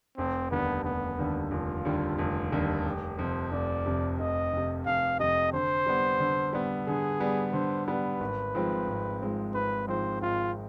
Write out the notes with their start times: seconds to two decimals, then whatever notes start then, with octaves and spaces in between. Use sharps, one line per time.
0.17 F1 C4
0.51 D#2 D3 G3 B3
0.85 F1 B3
1.19 D#2 D3 G3
1.51 F1 F4
1.85 D#2 D3 G3
2.18 F1
2.52 D#2 D3 G3
2.86 F1 G4
3.19 F2 C3 C5
3.52 F1 D5
3.86 F2 C3
4.19 F1 D#5
4.53 F2 C3
4.86 F1 F5
5.20 F2 C3 D#5
5.53 D3 C5
5.86 G3 B3
6.20 D3
6.53 G3 B3
6.87 D3 G#4
7.20 G3 B3
7.53 D3 C5
7.87 G3 B3 B4
8.20 G#1
8.54 G#2 F3 G#3 C4
8.87 G#1
9.22 G#2 F3 G#3 C4
9.55 G#1 B4
9.88 G#2 F3 G#3 C4 C5
10.22 G#1 F4